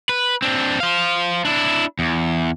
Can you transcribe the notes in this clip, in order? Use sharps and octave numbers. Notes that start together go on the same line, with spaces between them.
B4
C4 D4
C5 F5
D4 E4
E2